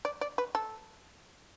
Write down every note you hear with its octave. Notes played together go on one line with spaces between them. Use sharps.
D5
D5
B4
A4